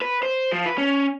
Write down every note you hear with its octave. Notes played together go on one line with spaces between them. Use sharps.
B4
C5
F3
B4
C#4